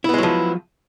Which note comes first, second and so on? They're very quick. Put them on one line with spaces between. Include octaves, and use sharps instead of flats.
E4 B3 G#3 F#3 F3